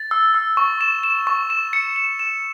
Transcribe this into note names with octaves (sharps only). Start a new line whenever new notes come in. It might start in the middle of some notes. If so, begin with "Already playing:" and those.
Already playing: A6
E6
E6
C#6
E7
E7
C#6
E7
C#7
E7
E7